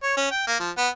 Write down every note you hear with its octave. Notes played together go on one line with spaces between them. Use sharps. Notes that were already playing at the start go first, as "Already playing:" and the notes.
C#5
C#4
G5
A#3
F3
B3